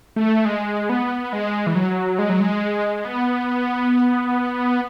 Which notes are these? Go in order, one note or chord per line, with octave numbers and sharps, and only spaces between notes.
A3
G#3
B3
G#3
E3
F#3
G#3
F#3
G#3
B3